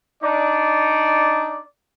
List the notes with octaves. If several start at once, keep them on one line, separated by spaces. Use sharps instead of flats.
D4 D#4 D5